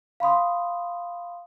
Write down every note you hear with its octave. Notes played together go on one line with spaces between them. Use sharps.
F5 B5 C6 D#6